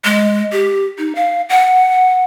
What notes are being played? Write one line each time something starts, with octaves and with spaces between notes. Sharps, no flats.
G#3
G4
D#4
F5
F#5